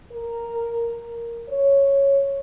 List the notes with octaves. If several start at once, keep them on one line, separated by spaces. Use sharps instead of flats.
A#4
C#5